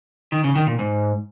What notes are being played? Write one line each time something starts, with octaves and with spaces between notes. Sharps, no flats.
D#3
C#3
D#3
A#2
G#2